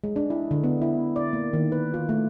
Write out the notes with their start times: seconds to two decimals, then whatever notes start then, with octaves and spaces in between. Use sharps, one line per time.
0.04 G#3
0.16 D4
0.30 E4
0.51 D3
0.64 B3
0.82 E4
1.16 D5
1.33 A#3
1.53 D#3
1.72 B4
1.94 F4
2.09 A3